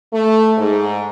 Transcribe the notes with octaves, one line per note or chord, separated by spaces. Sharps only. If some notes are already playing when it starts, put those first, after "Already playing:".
A3
G#2